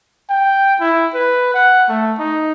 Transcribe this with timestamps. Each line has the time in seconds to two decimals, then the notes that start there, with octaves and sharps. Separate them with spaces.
0.30 G5
0.80 E4
1.14 B4
1.54 F#5
1.89 A3
2.19 D#4